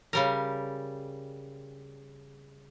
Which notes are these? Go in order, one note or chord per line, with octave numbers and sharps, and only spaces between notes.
C#3 G3 A#4